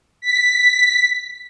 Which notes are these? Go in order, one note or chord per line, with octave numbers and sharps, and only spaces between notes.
B6